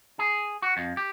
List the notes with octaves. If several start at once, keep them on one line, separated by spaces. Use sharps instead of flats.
G#4
F#4
F2
G4